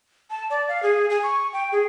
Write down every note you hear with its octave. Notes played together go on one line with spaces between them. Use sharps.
A5
D5
F5
G#4
G#5
C#6
G5
G#4